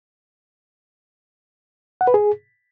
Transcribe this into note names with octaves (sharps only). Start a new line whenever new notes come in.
F#5
B4
G#4